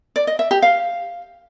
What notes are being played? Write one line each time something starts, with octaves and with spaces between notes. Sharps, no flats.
D5
D#5
E5
G4
F5